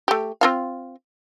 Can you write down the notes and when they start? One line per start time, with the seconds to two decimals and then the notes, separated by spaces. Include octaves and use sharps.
0.08 A3 G4
0.41 C4 F4 F5